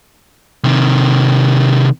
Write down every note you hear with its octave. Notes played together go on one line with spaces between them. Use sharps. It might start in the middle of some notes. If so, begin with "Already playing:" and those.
C3 D#3